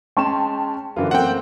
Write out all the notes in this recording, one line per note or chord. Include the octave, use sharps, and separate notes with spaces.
G#3 C#4 G5 A5 C6 E7
F#2 D3 E3 F4
A3 A#3 C4 F#5 G5